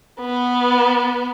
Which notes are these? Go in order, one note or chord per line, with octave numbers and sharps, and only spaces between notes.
B3